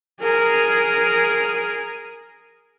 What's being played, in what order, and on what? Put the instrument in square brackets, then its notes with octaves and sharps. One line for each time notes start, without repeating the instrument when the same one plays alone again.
[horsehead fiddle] G#4 A#4